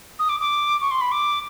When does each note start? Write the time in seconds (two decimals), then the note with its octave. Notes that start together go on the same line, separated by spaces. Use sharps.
0.19 D#6
0.29 D6
0.40 D6
0.81 C#6
0.91 C6
1.01 B5
1.12 D6